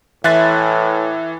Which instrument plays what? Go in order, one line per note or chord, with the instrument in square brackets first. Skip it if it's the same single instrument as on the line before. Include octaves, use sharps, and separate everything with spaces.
[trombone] A2 [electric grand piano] E3 F#6 A6 [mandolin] E5 G#5 C6